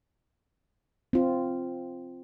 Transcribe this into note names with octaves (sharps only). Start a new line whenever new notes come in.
C4 F4